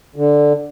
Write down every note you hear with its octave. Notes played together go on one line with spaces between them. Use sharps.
D3